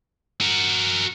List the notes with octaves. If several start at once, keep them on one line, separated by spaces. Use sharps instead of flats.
F#4 A#4